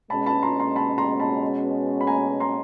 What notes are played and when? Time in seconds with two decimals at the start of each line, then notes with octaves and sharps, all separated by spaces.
0.10 B2 G#3 C#4 A5 B5
0.26 A5 B5
0.43 A#5 C6
0.59 A#5 C6
0.76 A5 B5
0.98 A#5 C6
1.20 A5 B5
2.01 B5
2.07 G#5 A#5
2.40 A#5 C6